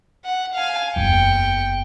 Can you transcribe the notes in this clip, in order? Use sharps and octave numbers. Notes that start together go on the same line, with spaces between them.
F#5
F5 G#5
F#1 E2 G5 C#7